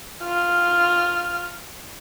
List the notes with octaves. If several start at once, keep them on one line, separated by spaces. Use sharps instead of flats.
F4 F6